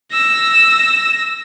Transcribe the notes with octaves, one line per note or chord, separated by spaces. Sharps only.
E6 A#6